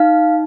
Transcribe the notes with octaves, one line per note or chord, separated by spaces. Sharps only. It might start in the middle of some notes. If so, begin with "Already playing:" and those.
Already playing: D#4 F5